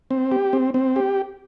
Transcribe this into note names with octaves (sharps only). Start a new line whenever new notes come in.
C4
G4
C4
C4
G4